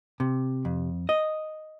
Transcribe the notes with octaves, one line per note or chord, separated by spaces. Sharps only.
C3
F2
D#5